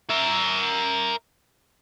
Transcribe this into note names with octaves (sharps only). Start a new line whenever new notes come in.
A#4 E5